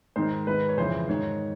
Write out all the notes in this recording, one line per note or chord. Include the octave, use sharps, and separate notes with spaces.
G#2 D#3 C5
G#2 D#3 B4
C#5
F2 C#3 E3 C5
G#2 D#3 C#5